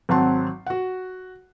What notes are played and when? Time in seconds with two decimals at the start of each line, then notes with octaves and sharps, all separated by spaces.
0.09 G#1 F#3 C4 F#5 A5 C6
0.66 F#4 F#5